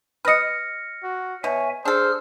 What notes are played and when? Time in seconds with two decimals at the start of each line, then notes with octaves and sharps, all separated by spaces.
0.25 B4 D#5 F6 A#6 C#7
1.03 F#4
1.44 B2 C#5 E5 G#5
1.85 D4 G#4 A4 C5 F6